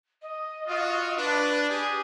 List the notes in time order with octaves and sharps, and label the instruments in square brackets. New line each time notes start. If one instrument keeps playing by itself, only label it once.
[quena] D#5
[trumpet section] F4 F#4
[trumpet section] D4 [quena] B4
[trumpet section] G4 G#4 [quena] G#5